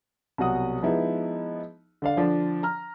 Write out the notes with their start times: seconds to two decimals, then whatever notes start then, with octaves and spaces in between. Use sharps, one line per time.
0.38 C2 B2 F#3 F#4 F#5 D#6
0.83 F3 G#3 B3 D#4 E4
2.02 D3 D4 F5
2.17 D3 F3 D4
2.63 A#5 F6